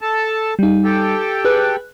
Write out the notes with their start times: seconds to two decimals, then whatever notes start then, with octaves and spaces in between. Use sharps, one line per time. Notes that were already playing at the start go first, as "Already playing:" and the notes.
0.01 A4 A5
0.59 G3 D#4
0.84 G4 A4 G5
1.45 G#4 B4 F#6